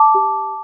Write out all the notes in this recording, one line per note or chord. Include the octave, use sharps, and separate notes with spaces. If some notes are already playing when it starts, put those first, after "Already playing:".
Already playing: A5 D6
G4